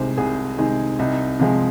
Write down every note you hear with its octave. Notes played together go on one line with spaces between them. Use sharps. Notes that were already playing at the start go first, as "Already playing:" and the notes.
Already playing: C2 C3 D#3 G#3 C5
C2 G#4
C3 D#3 G#3
C2 D#4
C3 F3 G#3